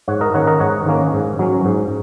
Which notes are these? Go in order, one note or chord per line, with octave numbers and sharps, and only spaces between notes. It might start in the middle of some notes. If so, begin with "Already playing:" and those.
G#2 C#5 F#5
A#4 D#5
D#3 A#3 C#4 C#5 F#5
A#4 D#5
G#2 C#5 F#5
D#3 A#3 C#4
G#2
F#3 C#4
G#2